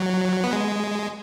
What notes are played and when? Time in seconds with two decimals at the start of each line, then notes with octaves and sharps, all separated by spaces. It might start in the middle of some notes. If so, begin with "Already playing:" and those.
Already playing: F#3
0.44 B3
0.53 G#3